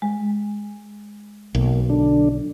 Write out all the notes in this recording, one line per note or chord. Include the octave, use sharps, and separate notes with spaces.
G#3
B1 A#3
D3 D4